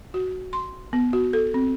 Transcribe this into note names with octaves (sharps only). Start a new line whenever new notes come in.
F#4
C6
B3
F#4
A4
C4